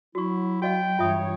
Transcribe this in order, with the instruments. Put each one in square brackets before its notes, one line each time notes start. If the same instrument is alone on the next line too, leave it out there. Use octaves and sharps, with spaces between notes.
[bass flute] F#3 [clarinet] E4 [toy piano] F#4 C#6
[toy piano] F#4 D#5 F5 [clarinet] G5
[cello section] G2 E3 C#5 [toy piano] F4 E5 D#6